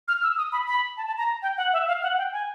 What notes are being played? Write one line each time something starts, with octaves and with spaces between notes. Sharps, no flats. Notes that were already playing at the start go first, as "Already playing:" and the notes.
F6
E6
D#6
B5
B5
A5
A5
A#5
G5
F#5
E5
F5
F#5
G5
G#5